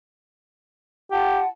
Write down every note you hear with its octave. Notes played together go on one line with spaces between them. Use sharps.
F4 G4 F#5 A5